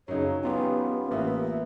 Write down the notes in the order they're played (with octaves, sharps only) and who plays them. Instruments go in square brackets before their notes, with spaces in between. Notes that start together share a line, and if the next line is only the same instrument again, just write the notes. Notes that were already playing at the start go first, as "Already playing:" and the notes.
[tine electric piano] F#2 C#3 [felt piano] F#3 D#4 [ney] C#5
[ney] B3 [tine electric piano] C#4 F4 G4
[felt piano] A1 A#3 B3 [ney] E5